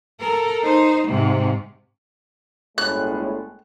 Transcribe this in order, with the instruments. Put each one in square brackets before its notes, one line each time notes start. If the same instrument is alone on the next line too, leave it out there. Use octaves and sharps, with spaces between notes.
[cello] A4 A#4
D#4 C5
G#2 C3
[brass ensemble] G1 A2 G#3 [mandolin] F#6